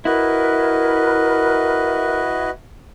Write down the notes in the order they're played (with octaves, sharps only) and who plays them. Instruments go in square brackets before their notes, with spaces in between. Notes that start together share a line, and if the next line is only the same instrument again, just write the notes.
[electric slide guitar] E4 [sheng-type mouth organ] F#4 B4 D#5 [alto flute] A#4